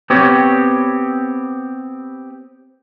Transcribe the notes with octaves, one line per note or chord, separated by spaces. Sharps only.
B3 C4 G4 C#5